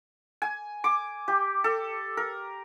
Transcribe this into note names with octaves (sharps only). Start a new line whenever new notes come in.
G#5
D6
G4
A4
A#4